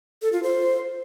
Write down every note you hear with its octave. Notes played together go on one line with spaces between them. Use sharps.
A4
F4
C5